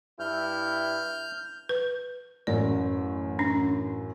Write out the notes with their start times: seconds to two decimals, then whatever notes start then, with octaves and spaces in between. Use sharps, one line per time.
0.20 G2 E4 F6 G6
1.69 B4
2.47 A1 F#2 D5
3.39 C#4 D4